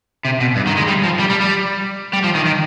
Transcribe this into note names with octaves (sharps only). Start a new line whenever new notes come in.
C3
B2
G2
D#3
G#3
G3
F3
G3
G3
G3
G3
F3
D#3
D#3